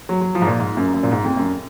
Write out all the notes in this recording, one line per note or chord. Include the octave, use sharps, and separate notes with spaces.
F#3
F#3
F3
G#2
A#2
G#2
F#2
F#2
A#2
G#2
F2
F#2